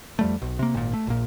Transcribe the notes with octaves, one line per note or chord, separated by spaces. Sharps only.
F2 G3 A3
B1
C3 A#3
G#1 A#2
A3
A#1 A#2